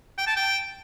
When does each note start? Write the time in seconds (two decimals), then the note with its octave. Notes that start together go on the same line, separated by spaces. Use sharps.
0.18 G5
0.27 A5
0.37 G5